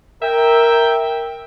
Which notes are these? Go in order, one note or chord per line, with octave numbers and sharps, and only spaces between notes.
A#4 E5 G5